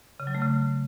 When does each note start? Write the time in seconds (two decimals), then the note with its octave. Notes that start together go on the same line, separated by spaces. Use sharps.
0.20 C#3
0.27 F#3
0.35 A3
0.42 C#3